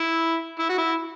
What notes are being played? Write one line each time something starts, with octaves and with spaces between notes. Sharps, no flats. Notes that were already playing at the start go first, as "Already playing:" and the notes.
Already playing: E4
E4
F#4
E4